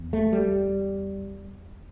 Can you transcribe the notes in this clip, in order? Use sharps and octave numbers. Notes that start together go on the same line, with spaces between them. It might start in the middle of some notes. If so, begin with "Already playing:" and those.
Already playing: E2
A3
G3